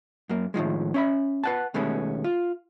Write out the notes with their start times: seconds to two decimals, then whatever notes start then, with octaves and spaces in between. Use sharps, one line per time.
0.29 F#2 A#3
0.54 A2 D#3 F3 G#3
0.94 C#4 E5 B5
1.44 B4 F#5 A5
1.74 D#2 B2 G#3 A3 B3 C#4
2.24 F4